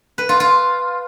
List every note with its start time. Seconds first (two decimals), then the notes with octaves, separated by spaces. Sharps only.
0.18 B4
0.29 F4
0.40 F4